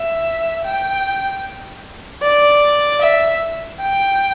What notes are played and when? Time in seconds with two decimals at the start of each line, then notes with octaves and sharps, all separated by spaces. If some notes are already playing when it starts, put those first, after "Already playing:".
Already playing: E5
0.65 G5
2.23 D5
3.01 E5
3.81 G5